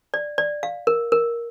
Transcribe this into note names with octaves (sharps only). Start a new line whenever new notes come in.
D5
D5
F5
A#4
A#4